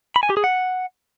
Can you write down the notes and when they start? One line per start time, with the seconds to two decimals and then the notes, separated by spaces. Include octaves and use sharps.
0.16 B5
0.23 G#5
0.30 G4
0.37 G#4
0.44 F#5